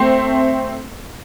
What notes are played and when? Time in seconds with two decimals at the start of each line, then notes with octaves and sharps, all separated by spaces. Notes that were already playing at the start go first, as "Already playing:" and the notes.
Already playing: A3 C4